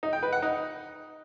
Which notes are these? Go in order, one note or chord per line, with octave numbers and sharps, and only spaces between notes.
D#4
G5
B4
F#5
D#4